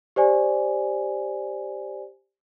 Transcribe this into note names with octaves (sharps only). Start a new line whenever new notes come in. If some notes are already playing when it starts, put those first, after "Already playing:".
G4 C5 D5 G#5